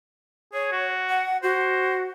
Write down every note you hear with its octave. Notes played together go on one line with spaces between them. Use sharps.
G#4 C#5
F#4
F#5
F#4 C5